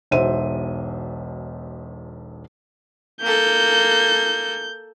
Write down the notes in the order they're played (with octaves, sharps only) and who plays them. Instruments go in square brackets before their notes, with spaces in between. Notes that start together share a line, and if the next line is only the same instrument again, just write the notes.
[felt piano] E1 B1 C5 E5 D#7
[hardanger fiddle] A#3 A4 [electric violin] G6